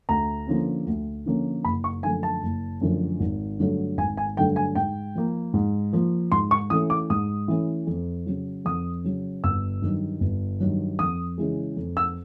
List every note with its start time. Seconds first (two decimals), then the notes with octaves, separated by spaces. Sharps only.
0.09 D2 A#5
0.47 D3 F3 A#3 C#4
0.87 D2
1.26 D3 F3 A#3 C#4
1.64 F#1 B5
1.84 C#6
2.03 F#2 D3 F3 A3 G#5
2.23 A5
2.43 F#1
2.81 F#2 D3 F3 A3
3.20 G#1
3.59 G2 D3 F#3 A3
3.97 G#1 G#5
4.17 G#5
4.37 G2 D3 F#3 A3 G5
4.56 G#5
4.75 G#2 G5
5.15 F3 A#3
5.54 G#2
5.93 F3 A#3
6.32 G#2 C6
6.51 C#6
6.70 E3 A3 C#4 D#6
6.90 D6
7.10 G#2 D#6
7.48 E3 A3 C#4
7.87 F2
8.26 C#3 F#3
8.65 F2 D#6
9.04 C#3 F#3
9.44 G1 E6
9.82 G2 D#3 F#3
10.20 G1
10.60 G2 D#3 F#3
10.99 F2 D#6
11.38 C#3 E3 G#3
11.77 F2
11.97 E6